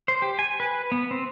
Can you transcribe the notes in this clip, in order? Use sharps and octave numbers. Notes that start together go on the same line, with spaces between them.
C5
G4
G#5
B4
B3
C4